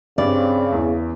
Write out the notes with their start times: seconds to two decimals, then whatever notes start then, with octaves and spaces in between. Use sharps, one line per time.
0.18 G2 C#3 C4 D5
0.72 E2 E3